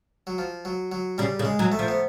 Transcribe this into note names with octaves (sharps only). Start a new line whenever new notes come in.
F#3
F3
F#3
F#3
C#3 G3
C#3
G#3
F#3
A3
F3
B3